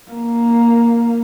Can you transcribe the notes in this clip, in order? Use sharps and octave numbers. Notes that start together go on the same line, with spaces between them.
A#3